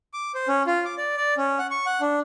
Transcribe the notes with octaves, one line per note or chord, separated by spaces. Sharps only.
D6
C5
C#4
F4
D6
D5
D5
C#4
F#5
C#6
F#5
D4